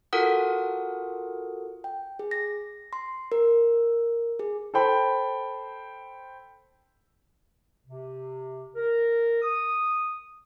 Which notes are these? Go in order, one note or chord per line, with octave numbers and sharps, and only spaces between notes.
F4 F#4 A4 A#4 F#5 D#6
G5
G#4
A#6
C6
A#4
G#4
A4 C5 G5 B5
C3
A#4
D#6